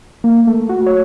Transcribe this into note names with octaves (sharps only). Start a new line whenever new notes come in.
A#3
A3
F#4
C#5